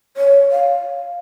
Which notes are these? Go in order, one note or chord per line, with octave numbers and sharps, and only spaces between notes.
C#5
F5